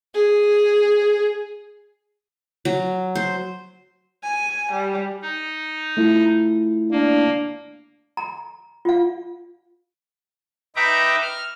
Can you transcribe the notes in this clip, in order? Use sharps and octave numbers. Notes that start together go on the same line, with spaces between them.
G#4
F#3
C5
G#5
G3
D#4
A3 E4 F4
A#3 D4
A#5
F4 F5
D#4 B4 E5 G5 A#5 D6
F6